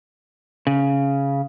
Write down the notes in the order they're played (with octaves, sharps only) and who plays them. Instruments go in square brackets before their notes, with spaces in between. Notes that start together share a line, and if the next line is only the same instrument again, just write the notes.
[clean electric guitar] C#3